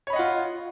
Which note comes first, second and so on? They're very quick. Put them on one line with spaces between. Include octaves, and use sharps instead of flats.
C#5 B5 D#5 F#5 F4